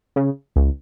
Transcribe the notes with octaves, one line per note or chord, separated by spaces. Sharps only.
C#3
C#2